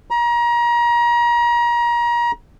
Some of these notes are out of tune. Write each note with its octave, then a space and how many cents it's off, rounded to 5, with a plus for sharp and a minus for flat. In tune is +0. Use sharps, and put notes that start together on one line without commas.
A#5 +30